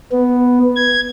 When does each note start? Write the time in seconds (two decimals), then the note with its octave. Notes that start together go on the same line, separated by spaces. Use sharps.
0.12 B3
0.76 G#6